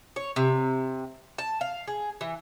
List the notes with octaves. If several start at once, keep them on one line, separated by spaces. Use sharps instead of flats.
C#5
C3
A5
F5
G#4
E3